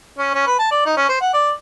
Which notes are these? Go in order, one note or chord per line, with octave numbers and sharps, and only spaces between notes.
C#4
C#4
B4
A5
D5
D#4
C#4
C5
F#5
D5